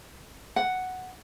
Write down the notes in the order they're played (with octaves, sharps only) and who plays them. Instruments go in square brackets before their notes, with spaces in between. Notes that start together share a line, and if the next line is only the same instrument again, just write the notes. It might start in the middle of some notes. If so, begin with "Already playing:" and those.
[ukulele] F#5